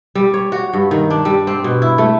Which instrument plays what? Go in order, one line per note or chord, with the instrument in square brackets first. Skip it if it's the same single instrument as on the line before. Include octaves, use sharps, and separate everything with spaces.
[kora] G3
C#5
F#4
G2
D#3
D4
G3
C4
B2
E4
A3